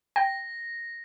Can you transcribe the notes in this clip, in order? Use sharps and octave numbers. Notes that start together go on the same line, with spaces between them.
G5 A#6